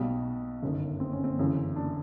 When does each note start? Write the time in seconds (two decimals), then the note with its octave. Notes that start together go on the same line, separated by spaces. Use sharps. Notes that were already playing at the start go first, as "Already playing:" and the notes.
Already playing: B1 B2 G3
0.63 G1 F#2 D#3
1.00 C4
1.13 C#4
1.24 C4
1.38 G1 F#2 C#3 E3
1.76 D4